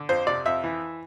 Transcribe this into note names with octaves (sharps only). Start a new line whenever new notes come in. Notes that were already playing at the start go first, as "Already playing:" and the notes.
Already playing: D3
F2 C5
C3 D5
F2 E5
E3